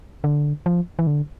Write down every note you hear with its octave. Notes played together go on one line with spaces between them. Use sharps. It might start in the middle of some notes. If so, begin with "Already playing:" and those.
D3
F3
E3
D3